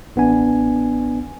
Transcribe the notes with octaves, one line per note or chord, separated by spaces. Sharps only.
A1 B3 D4 G#5